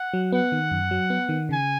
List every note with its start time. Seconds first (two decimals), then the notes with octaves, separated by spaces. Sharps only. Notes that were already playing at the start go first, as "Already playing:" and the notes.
Already playing: F#5
0.14 F#3
0.32 B3 F#5
0.52 D#3
0.71 F#2
0.91 F#3
1.10 B3
1.29 D#3
1.49 C#3 G#5